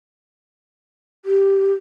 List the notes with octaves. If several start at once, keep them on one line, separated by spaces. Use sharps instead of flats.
G4